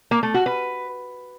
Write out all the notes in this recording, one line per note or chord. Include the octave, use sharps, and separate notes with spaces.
A#3
A3
F#4
B4